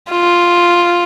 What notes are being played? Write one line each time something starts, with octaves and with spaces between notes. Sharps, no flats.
F4